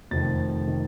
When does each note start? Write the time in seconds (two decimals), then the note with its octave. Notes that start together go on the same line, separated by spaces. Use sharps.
0.11 F1 F2 D#3 A6
0.68 D#3